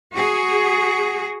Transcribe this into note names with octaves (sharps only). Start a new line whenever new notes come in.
F#4 G#4